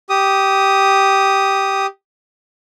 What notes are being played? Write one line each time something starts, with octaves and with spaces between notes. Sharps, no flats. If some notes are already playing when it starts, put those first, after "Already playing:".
G4 D#6